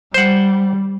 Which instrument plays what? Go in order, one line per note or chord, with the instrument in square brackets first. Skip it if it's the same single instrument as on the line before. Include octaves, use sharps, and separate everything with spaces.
[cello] G3 [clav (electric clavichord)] C5 F#5